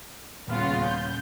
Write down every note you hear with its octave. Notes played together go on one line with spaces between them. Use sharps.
D#1 C#3 B3 F4 F6
G6